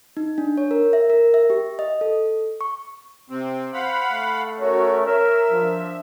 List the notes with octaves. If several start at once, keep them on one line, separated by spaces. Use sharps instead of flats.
D#4
D4
C#5
A#4
E5
A#4
E5
G4
D#5
A4
C#6
C3 C4
C5 F5 F#5 B5
A3
C#4 F#4 A#4 C#5
A#4 C#5 E5
F3 D4